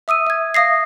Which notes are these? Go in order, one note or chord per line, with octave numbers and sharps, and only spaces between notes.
E5 D#6 E6 D#7
E5 G#6
E5 F5 D#6 A#6 C7